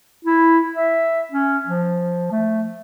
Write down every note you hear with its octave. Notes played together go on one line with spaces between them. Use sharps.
E4
E5
C#4
F3
A3